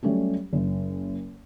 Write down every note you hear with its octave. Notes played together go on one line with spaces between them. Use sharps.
F#3 G3 A3 C#4 G4
F#1